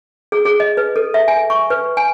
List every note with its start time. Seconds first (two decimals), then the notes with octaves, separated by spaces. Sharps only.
0.32 G#4
0.45 G#4
0.60 D#5
0.77 B4
0.96 A4
1.14 E5
1.28 G#5
1.50 C#6
1.70 B4
1.97 G#5